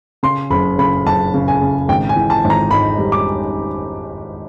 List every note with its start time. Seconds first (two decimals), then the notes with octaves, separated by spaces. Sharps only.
0.23 C#3 C6
0.50 F#1 B5
0.78 C#3 B5
1.06 F#1 A5
1.34 C#3
1.48 G#5
1.61 C#3
1.89 G#1 G5
2.09 G#5
2.16 E3
2.30 A5
2.44 G#1
2.50 A#5
2.71 G#2 B5
2.98 G3
3.12 D6